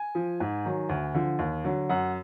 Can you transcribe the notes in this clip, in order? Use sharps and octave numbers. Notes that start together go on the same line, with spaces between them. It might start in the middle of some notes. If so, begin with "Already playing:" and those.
Already playing: G#5
F3
G#2
D#3 F#3
D2
D3 F3
D#2
D3 F#3
F#2 F#5